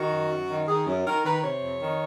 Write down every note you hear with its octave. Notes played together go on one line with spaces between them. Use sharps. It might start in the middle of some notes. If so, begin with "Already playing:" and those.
Already playing: D#3 F#4
F#2
F#2
D#3
D#3 G#4
F#2
D#3 A#4
D#3 B4
C3 C#5
F2
D#3